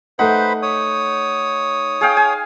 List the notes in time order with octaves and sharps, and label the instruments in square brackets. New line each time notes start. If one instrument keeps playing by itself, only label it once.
[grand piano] A3 F#5 [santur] D#4 [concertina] B4 C5 B5
[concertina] C#5 D#6
[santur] G#4 F5 G5
G#5